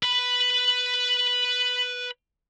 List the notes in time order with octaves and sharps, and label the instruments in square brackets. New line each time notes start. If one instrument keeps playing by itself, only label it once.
[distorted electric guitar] B4 B5